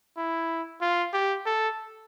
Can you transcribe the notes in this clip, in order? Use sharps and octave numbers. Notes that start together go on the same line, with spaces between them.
E4
F4
G4
A4